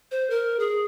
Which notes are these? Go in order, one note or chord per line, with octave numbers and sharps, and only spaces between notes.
C5
A#4
G#4